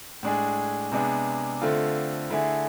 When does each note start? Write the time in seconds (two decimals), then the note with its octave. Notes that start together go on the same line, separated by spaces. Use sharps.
0.23 A2 G#3 D4 G#4
0.92 C3 G#3 B3 D4 G#4
1.61 D3 A3 C4 F4
2.30 D3 A3 E4 G#4